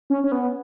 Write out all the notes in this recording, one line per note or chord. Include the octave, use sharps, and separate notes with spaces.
C#4
C#4
B3